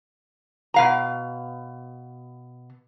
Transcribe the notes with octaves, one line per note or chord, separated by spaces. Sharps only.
B2 F5 A#5